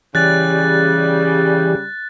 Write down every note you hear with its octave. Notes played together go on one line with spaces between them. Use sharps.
C#3 E3 G3 G4 F#6 A6